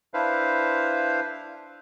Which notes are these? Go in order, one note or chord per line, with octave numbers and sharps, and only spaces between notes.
D4 E4 B4 C5 F5